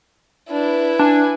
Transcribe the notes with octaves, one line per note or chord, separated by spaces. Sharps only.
D4 E4 B4
D4 G#5